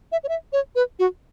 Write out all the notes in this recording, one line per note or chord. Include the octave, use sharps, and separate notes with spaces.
E5
C#5
E5
C#5
B4
F#4